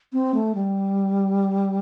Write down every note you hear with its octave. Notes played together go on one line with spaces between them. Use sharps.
C4
A3
G3